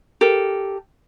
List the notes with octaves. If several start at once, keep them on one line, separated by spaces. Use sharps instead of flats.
G4 A4 A#4